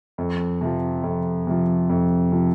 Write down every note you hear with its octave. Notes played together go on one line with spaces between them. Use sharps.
F2
C3 F3
F2
C3 F3
F2
C3 F3